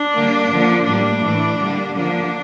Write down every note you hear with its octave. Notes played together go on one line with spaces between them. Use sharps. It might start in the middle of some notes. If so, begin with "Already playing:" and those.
Already playing: D4
D3 G3 A#3
D3 F3 A#3
A2 G3 A#3 D4
A2 E3 A3
D3 G3 A#3
D3 F3 A#3 D4